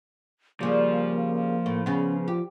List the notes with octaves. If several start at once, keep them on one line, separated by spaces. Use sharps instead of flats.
C#3 F3 G3 A#3
A2
C#3 B3 C#4
F4 G4